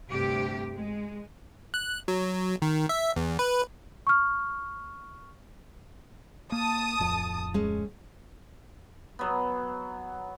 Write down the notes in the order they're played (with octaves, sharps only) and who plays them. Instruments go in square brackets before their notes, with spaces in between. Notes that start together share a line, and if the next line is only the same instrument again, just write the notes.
[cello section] D2 G2 C3 G4
G#3
[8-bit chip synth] F#6
F#3
D#3
E5
E2
B4
[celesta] C#6 F6
[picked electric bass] A#3 [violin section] A5 D#6
[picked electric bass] D1 F2
[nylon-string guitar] G#3 C#4
[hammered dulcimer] F#3 B3